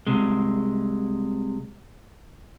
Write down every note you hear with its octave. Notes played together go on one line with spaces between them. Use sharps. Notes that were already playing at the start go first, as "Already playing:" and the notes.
C2 C3 G#3